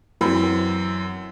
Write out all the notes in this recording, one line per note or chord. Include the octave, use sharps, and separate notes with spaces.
F#2 E3 F#3 C4